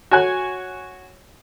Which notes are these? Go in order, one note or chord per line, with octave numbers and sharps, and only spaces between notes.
F#4 C#5 G#5 F#6